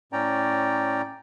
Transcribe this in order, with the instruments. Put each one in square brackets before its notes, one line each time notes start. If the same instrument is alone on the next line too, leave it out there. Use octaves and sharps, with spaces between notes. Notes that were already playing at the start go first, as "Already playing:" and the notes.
[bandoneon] A2 C#4 D5 G5 A#5